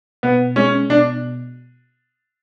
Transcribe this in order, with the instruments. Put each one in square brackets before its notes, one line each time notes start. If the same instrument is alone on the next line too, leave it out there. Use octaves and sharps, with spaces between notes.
[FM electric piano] B2 [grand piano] B3
[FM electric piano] G#3 [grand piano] C#4
[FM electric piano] B2 [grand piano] D4